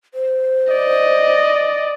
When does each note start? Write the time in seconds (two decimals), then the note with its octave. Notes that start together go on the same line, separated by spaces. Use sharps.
0.14 C5
0.72 D5 D#5